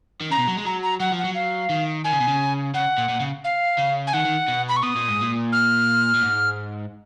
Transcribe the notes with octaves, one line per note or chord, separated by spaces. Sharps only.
D#3
C#3 A#5
B2
F#3
G#3
F#3 A#5
A#5
F#3 F#5
F3
F#5
F#3
F5
D#3
D#3 G#5
C#3
B2
C#3
C#3 F#5
A#2
A#2
C#3
F5
C#3
G#5
D#3 F#5
D#3
B2
B5
C#6
B2 D#6
A#2
G#2
A#2
F6
A#2
G#2